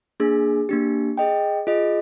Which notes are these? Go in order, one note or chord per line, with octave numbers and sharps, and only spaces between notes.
A#3 D4 G#4
A#3 D4 G4
G#4 D#5 G5
F4 G#4 D#5